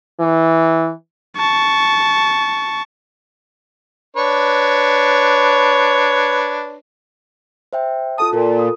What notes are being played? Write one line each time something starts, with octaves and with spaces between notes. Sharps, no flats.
E3
A5 C#6
D4 B4 C#5
C5 E5 G5
F4 A4 A5 D#6
A#2 F4 A4 A#4
D#6